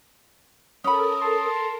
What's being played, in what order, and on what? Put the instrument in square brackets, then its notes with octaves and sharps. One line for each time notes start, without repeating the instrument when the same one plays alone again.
[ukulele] C#4 B5 [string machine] A4 A#4 [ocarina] D#6
[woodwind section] A5 C6